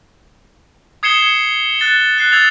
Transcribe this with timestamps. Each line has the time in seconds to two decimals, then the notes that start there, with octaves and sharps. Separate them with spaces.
1.03 D#6 G#6 C7 C#7 E7 G7
1.80 F#6 A6 G7
2.18 F#6 C7
2.32 E6 G#6 A6 F7